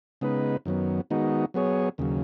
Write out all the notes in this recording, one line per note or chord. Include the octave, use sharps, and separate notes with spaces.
C#3 G#3 B3 D#4 B4
F#2 D#3 F#3 B3
D#3 G#3 B3 D#4 F#4
F#3 B3 G#4 C#5
D#2 C#3 F#3